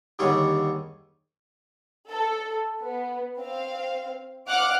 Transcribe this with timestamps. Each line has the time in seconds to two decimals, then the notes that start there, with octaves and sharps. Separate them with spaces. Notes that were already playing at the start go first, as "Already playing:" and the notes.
0.19 D#2 D3 G3 G#4 C#5
2.10 A4
2.81 B3
3.39 C4 F5
4.48 F5 F#5 D6 F6 F#6